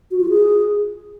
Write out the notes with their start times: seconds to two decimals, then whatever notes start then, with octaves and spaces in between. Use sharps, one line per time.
0.11 F#4
0.20 F4
0.30 G#4